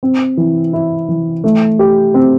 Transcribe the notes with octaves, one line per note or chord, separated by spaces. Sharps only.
C4
E3
E4
E3
A3
G4
C4